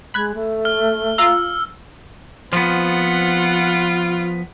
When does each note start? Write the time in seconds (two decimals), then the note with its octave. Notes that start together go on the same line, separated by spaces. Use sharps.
0.14 G#3 B5 F#6 G#6
0.34 A3
0.65 F6
1.18 F4 F5 A#5 E6
2.53 F3 B3 C4 F4 F#5